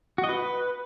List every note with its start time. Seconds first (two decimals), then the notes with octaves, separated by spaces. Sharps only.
0.18 F#4
0.24 D#5
0.29 B4